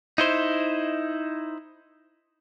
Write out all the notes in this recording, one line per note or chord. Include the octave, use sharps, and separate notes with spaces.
D#4 E4 C5